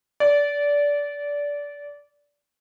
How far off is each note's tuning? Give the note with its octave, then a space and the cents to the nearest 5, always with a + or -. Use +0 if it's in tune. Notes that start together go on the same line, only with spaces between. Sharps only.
D5 -20